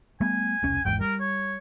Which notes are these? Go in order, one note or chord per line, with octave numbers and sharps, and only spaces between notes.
G3 A3 B3 G#5
E1 C2 C#4
G#1 E2 G#2 G5
G3 A#4
C#5